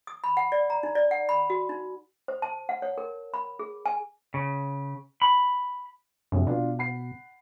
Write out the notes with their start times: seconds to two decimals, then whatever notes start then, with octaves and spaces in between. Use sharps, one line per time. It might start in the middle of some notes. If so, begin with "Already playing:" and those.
0.07 D#6
0.24 B5
0.37 F#5
0.52 D5
0.70 A#5
0.83 D#4
0.95 D5
1.11 F#5
1.29 B5
1.50 F#4
1.69 D#4
2.28 C5
2.42 A5
2.69 F#5
2.82 C#5
2.98 A#4
3.34 B5
3.59 G#4
3.86 G#5
4.34 C#3
5.22 B5
6.32 A#1 F#2 C3
6.47 B2 D4 F4
6.79 F#5 B5 C7